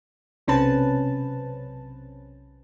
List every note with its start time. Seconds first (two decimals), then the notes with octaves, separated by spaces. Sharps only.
0.47 B1 C3 C4 C#4 B4 A5